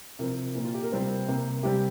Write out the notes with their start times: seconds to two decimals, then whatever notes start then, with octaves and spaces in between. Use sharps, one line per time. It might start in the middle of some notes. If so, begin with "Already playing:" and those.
0.19 C3 F3 C4 A#4
0.55 A#2 A#3
0.64 F4
0.74 G4
0.83 A#4
0.92 C3 G3 C4 C5
1.28 C3 A#3
1.63 C3 G3 C4 G4